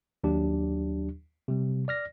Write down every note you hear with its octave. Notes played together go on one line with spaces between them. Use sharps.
D#2 F#3 D4 G4
C3 G3
D5 F6 A#6